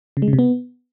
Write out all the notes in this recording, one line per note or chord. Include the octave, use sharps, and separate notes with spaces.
C#3
G#3
C#3
C3
B3